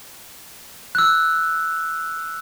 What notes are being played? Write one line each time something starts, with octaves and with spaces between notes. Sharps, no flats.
E6 F#6